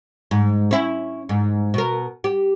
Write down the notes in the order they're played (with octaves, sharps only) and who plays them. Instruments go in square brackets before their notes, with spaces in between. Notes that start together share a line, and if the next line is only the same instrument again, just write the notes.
[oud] G#2
C#4 E4
G#2
B2 A#4
G4